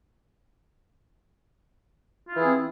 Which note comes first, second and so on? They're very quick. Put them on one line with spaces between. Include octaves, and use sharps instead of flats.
F4 E4 E3 G#4 C4